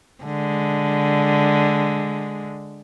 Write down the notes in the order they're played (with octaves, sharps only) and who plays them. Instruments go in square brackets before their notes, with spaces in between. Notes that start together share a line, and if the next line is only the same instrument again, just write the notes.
[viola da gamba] D3 G#3